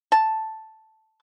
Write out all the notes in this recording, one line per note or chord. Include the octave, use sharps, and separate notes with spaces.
A5